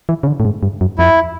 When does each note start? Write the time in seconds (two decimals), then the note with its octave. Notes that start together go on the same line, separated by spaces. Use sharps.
0.09 E3
0.23 C#3
0.27 D3
0.40 A2
0.45 G#2
0.63 G2
0.81 F#2
0.98 F2 E4